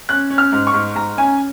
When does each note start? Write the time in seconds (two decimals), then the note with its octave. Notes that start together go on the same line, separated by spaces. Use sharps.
0.09 C#4 F#6
0.30 C#4
0.38 F6
0.52 G#2
0.67 C#6
0.74 G#2
0.95 G#2 A#5
1.18 C#4 G#5